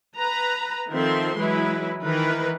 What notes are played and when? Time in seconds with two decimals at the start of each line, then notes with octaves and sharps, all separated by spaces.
0.17 B4 A#5
0.91 D#3 F3 C4 A4 E5 C6
1.37 E3 F#3 G#3 E4 B4
2.02 D#3 E3 A#4 B4